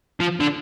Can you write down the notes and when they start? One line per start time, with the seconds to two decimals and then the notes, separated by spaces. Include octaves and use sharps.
0.20 F3
0.40 D3